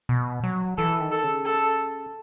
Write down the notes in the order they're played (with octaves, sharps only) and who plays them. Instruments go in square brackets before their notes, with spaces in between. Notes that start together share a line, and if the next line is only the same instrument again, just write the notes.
[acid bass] B2
F#3
[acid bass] E3 [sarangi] A4
[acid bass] D#3
[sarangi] A4
[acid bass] C#3
[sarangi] A4